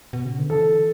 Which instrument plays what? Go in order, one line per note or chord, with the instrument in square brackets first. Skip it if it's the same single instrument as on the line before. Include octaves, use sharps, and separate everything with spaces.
[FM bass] B2
C#3
D3
[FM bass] E3 [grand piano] A4